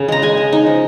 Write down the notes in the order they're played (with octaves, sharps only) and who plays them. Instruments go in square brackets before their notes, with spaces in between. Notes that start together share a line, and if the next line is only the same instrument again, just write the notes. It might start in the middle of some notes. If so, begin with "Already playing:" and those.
Already playing: [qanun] C#3
G#3 A#5
G#3 G#5
G#3
D#4
F3